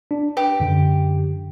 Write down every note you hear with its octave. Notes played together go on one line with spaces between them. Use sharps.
D4
G4 B4
F#2 D3